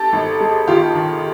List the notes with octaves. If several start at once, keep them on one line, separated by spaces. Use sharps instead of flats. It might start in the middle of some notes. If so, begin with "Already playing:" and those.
Already playing: G4 A4
G#1
G#3
D#3 F4 G4
D#3